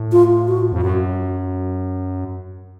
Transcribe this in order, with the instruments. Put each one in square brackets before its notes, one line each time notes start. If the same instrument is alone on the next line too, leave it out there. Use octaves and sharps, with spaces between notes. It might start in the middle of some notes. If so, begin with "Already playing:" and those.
Already playing: [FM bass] A2
[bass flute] F4
F#4
[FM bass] F2
[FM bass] F#2 [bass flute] F#4